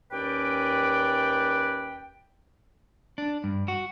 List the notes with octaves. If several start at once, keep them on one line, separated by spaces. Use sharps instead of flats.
D#2 C#4 B4 D5 G5
D4
G2
F#4